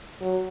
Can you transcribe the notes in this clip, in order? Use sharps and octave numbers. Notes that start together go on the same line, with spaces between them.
F#3